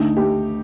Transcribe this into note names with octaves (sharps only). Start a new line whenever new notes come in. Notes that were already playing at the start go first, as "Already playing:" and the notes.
Already playing: D2 D3 A3 D#4
A3 G4